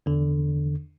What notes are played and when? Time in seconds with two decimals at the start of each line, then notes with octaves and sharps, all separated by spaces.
0.06 E2 D3